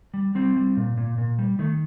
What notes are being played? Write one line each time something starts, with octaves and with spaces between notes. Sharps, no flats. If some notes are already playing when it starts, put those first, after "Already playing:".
G3
G3 C4
G3
A#2
A#2
A#2
G3
D#3 A3